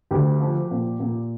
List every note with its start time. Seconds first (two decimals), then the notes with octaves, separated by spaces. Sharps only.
0.11 D2 G4
0.40 F3
0.71 A#2
1.00 A#2